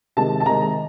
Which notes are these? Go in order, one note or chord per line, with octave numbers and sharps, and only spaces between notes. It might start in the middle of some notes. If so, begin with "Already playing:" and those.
C3 D#3 G#3 A5
A5
C3 D#3 G#3 A#5